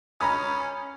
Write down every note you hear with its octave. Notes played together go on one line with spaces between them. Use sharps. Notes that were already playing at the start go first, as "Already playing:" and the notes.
C#4 A#5 B5 D#6